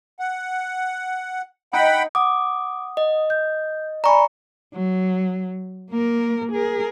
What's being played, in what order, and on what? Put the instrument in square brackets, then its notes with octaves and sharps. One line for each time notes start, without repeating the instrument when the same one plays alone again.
[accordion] F#5
[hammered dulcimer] D#4 [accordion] F#5 G5 B5
[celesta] F#5 D#6 [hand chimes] D6
[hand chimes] D#5
[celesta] G6
[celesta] D5 G#5 B5 [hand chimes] A#5 C#6
[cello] F#3
A#3 A#4
G#4 A#4